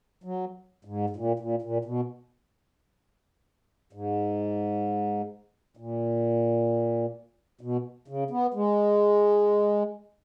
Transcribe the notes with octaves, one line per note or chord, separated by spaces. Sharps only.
F#3
G#2
G#2
A#2
A#2
A#2
B2
G#2
A#2
B2
C#3
B3
G#3